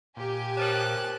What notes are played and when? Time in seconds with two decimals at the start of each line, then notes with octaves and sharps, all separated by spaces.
0.17 A#2 G4 G#5
0.57 A#4 C5 C#5 A5 F#6